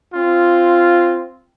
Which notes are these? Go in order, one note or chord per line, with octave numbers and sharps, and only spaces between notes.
C4 F4